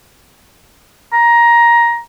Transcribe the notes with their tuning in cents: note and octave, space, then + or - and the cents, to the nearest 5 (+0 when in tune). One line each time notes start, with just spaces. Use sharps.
A#5 +15